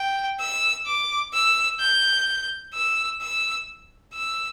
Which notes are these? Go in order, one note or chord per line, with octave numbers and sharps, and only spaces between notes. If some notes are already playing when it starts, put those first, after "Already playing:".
Already playing: G5
E6
D6
E6
G6
E6
E6
E6